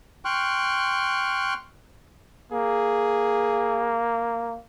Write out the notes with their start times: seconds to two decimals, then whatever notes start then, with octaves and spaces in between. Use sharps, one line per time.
0.25 G5 C6 C#6 F6 F#6
2.52 A#3 G#4